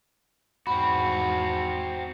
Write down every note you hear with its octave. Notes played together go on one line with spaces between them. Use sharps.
E2 G#2 C4 F#4 B5